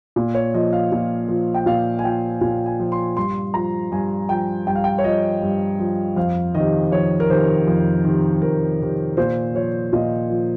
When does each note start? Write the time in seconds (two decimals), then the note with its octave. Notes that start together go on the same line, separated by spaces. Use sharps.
0.16 A#2
0.35 C#5
0.54 F3 D#5
0.73 F5
0.92 A#2
1.28 F3
1.54 G5
1.66 A#2 F5
1.99 G#5
2.04 F3 G5
2.41 A#2 G#5
2.66 G#5
2.80 F3
2.92 C6
3.17 G2 C6
3.54 F3 A#5
3.91 G2 G#5
4.29 F3 G5
4.67 G2 G5
4.76 F5
4.84 G5
4.98 C#5
5.04 F3 D#5
5.42 G2
5.79 F3
6.16 F2 F5
6.55 C3 D#3 D#5
6.92 F2 C#5
7.20 A#4
7.30 C3 D#3 C5
7.67 F2
8.04 C3 D#3
8.42 F2 A#4
8.80 C3 D#3
9.17 A#2 C5
9.54 F3 C#5
9.93 A#2 D#5
10.29 F3